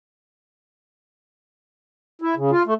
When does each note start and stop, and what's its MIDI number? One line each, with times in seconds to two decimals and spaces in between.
2.22 2.35 64
2.37 2.51 49
2.51 2.63 65
2.66 2.74 57